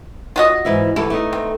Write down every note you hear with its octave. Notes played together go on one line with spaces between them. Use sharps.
F4 F#4 D#5
G#2 E3 E5
D2 E3 E4 A4
A3 B3 D#4
C4